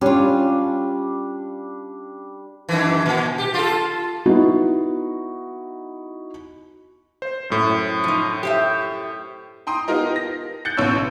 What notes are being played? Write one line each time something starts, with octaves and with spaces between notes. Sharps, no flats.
G3 C#4 D4 F4
F#2 D#3 E3
A#2
G4
F4 A4
B3 D#4 E4 F#4
C5
F#2 A2
F3 D#4
G4 C5 E5
G5 A#5 C6 D#6
B3 D#4 F4 G4 A#4 D#5
A#6
F#6 G6 A6 C#7
A1 B2 C#5 C#6 E6